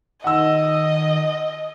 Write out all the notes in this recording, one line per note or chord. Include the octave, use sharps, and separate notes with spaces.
D#3 D#5 F#5 E6